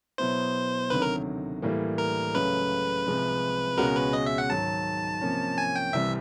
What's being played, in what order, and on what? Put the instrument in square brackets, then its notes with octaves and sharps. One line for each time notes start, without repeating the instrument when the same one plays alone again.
[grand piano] B2 F#3 B3 E4 [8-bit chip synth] C5
[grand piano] D2 C3 D#3 F#3 [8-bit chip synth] B4
[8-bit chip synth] A#4
[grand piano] A2 E3 G3 A#3
[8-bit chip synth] A#4
[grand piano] C#2 C#3 F#3 A3 [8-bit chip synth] B4
[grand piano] C2 C3 F3 G#3 C4
[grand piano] C#2 B2 G#3 C#4 F#4 [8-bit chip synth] A#4
[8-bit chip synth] B4
D#5
E5
F#5
[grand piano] G#2 D#3 F#3 [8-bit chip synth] A5
[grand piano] C3 F3 A#3 C#4
[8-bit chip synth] G#5
G5
[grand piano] C2 C3 E3 G3 C4 [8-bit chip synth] E5